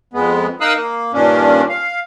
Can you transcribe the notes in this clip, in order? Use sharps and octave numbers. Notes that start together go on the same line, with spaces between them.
F2 G#3 B3
D#4 A#4 F5 D#6 E6 F#6
A#3
G2 A#2 D#3 C#4 D4
F5